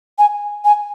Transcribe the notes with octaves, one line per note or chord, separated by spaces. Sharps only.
G#5
G#5